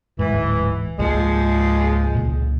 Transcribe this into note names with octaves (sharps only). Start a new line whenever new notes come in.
D1 G#2 E3
C#2 G#2 F3 G#3 A#3
C#2 A#2